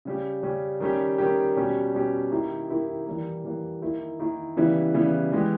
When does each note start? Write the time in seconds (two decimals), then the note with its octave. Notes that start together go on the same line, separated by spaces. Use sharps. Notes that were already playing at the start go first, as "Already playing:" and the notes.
0.05 C#3 G3 C#4 G4
0.43 C#3 G3 C#4 G4
0.80 D#3 G3 C#4 G4
1.18 D#3 G3 C#4 G4
1.56 B2 G3 C#4 G4
1.94 B2 G3 C#4 G4
2.31 D#3 A#3 E4 G4
2.68 D#3 A#3 E4 G4
3.06 E3 G3 A#3
3.44 E3 G3 A#3
3.82 D#3 A#3 E4
4.19 D#3 A#3 E4
4.57 C#3 E3 G3 B3 E4
4.94 C#3 E3 G3 B3 E4
5.32 E3 G#3 B3 G4